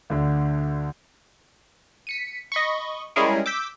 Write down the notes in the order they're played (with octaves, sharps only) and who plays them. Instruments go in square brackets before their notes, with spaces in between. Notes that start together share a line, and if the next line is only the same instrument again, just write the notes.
[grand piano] D2 D3
[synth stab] B6 C#7 D#7
D#5 B5 C#6
G3 G#3 C#4 E4 G#4 A#4
D6 E6 G6 B6